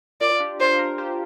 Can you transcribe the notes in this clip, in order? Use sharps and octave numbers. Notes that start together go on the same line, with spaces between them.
F4 A#4 D5
F4
D4 G4
F4 A#4 C5
F4 A#4
G4 C5